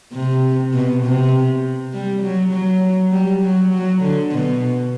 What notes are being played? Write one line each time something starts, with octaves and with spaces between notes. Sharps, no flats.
C3
B2
C3
G3
F#3
F#3
G3
F#3
F#3
D3
B2